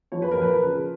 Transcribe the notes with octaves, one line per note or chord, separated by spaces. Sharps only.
F3 C#5
B4
A#4
F3 B4
C#3